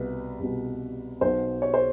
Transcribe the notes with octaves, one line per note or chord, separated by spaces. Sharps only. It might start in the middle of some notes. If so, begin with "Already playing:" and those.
Already playing: C2 B2 B4
C2 B2
B1 B2 C5
C#5
C5